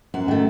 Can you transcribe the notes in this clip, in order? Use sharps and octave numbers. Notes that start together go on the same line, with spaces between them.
F#2 F#4
D#3 A3